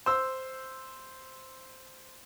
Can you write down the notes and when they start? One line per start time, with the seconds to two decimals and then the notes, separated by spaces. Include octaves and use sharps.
0.06 C5 E6